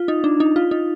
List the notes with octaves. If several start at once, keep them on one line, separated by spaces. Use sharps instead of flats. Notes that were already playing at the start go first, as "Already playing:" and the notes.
Already playing: F4
D#4
D4
D#4
F4
D#4